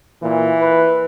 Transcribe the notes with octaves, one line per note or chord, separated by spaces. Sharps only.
A#2 E3
B4